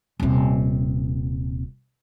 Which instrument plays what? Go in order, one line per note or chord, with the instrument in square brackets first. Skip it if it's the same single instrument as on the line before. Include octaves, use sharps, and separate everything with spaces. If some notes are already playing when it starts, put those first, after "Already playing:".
[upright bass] D#1 C3